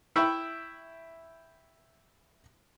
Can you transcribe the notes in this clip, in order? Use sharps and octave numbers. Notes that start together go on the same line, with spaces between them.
E4 E5 G5 B5 C#6